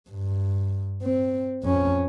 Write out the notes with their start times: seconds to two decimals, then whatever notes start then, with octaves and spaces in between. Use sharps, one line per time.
0.10 G2
1.03 C4
1.63 F2 C#4